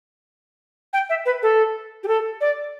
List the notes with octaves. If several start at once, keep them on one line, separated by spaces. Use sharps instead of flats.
G5
E5
B4
A4
G4
A4
D5